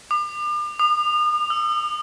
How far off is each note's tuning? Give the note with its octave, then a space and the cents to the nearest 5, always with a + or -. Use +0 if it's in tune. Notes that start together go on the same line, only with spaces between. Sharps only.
D6 +40
D#6 -40
E6 +15